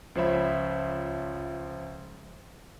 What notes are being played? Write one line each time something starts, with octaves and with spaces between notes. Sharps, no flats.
C#2 F3 C5 C#5 E5 B5